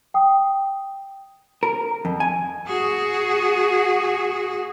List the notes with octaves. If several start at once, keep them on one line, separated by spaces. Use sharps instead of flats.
G5 D#6
A#4
F2
G#5
F#4 G#4